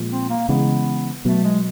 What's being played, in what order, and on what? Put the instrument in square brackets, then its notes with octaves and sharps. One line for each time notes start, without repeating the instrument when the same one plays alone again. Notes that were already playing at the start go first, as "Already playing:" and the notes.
Already playing: [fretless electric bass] A#2 F3 G#3
[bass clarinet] C4
A#3
[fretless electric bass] C#3 E3 G#3 [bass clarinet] B3
[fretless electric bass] B2 F#3 B3 [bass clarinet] A3
[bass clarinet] G#3